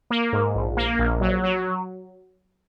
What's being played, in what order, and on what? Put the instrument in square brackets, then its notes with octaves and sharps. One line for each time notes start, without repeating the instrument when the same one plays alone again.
[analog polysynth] A#3
G#2
A#1
A#3
A#1
F#3
F#3